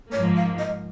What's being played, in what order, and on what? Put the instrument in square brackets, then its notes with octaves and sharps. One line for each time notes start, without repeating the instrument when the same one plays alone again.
[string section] G#2 F3 A#3 [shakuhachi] C#5
[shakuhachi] F5
D#5